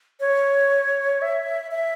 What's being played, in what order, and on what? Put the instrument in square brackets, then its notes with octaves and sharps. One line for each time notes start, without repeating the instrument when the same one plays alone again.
[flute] C#5
E5
E5